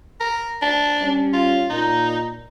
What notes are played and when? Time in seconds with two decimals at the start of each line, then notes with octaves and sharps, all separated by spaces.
0.20 A#4
0.62 D4
1.02 G3 C#4
1.33 F4
1.70 A#2 D#4